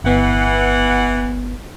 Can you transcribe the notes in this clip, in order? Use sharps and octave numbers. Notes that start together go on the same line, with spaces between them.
G1 E3 B3 F#5